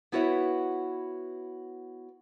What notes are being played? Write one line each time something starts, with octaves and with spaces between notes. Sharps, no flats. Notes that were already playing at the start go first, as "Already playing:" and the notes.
B3 E4 F#4 B4 C#5 E5